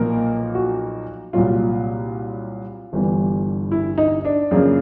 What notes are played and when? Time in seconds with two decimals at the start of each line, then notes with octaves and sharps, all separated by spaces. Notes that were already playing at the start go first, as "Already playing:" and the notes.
Already playing: B1 A#2 F3 A#3 A#4
0.55 F#4
1.33 C2 A#2 F#3 F4
2.93 G1 G2 E3 G3
3.71 E4
3.98 D#4
4.25 D4
4.51 F#2 C#3 F3 A#3